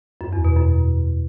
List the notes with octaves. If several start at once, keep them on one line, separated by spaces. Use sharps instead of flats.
F#2
E2
B2
F#2